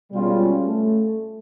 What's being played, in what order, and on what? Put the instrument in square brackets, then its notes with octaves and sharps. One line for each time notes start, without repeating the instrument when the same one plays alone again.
[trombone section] B2 G#3 C#4 F4 [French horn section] G3
[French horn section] A3